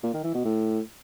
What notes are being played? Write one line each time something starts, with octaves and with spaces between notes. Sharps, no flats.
A#2
D#3
E3
B2
A2